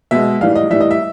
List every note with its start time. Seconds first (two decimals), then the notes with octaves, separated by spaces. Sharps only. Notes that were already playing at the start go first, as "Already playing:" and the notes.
0.11 B2 G#3 E5
0.41 A2 E3 G3 F5
0.56 D#5
0.70 A2 E3 G3 E5
0.81 D#5
0.91 E5